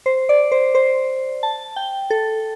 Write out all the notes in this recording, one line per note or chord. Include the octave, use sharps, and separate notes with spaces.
C5
D5
C5
C5
A5
G5
A4